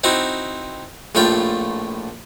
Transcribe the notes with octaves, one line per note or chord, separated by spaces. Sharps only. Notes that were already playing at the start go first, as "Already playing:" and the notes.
C4 D#4 E4 F#4
A#1 A2 A3 F4 G5